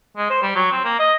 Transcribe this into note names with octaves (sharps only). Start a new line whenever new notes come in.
G#3
C5
G3
F#3
C4
A#3
D#5